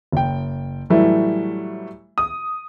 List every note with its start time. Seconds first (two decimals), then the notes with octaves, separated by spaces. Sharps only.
0.12 F#1 G5
0.90 A2 E3 F#3 G3 A3
2.18 D#6